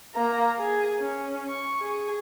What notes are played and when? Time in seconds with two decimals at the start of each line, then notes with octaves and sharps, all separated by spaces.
0.14 A#3 A#5
0.59 G#4
1.00 C#4
1.48 C#6
1.80 G#4